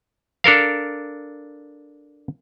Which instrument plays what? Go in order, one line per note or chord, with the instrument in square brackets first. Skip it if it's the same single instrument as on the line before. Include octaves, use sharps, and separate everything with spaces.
[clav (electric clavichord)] D4 A4 A#4 F5